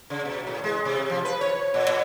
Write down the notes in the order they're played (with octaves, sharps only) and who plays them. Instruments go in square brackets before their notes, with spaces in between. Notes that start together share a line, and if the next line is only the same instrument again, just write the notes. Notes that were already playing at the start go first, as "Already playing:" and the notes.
[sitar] C#3
B2
A2
G#3
C3
F3
B4
C#5
A#2
A#2